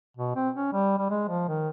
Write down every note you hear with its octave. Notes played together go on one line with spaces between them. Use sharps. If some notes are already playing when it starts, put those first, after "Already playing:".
B2
C4
C#4
G3
G3
G#3
F3
D#3